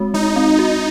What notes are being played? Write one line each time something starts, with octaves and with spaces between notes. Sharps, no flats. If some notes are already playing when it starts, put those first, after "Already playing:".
Already playing: G#3 C4 F#4
G#3 D#4
C4
F#4